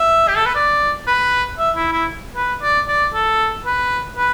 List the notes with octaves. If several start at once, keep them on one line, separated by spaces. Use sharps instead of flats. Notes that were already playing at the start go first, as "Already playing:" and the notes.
Already playing: E5
G4
A4
B4
D5
B4
E5
E4
E4
B4
D5
D5
A4
B4
B4